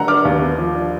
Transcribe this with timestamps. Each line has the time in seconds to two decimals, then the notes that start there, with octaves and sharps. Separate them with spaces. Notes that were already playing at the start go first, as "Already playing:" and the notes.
Already playing: D3 F#3 F#5 A#5
0.08 D4 D6 F6
0.25 D#2
0.42 B3
0.58 F3
0.75 D4